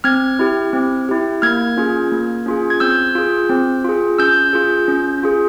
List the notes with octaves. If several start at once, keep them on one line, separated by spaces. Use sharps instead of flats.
C4 F6 G#6
E4 G4
C4
E4 G4
A#3 F6 G#6
C#4 F4 G#4
A#3
C#4 F4 G#4
G#6
C4 E6 G6
F4 G#4
C4
F4 G#4
C#4 E6 G6
F4 G#4
C#4
F4 G#4